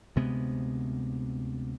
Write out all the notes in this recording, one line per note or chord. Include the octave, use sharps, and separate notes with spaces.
D2 C3 G#3 B3